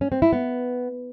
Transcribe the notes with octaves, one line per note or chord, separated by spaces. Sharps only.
C#4
C4
E4
B3